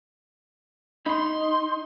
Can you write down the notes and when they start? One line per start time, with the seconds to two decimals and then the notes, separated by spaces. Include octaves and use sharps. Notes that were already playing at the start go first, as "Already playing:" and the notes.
1.06 D#4 B5 C6